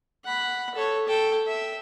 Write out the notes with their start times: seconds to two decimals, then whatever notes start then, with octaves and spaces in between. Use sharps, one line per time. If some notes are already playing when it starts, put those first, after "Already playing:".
0.25 F#5 B5
0.75 A4 C#5
1.07 A4 G5
1.47 E5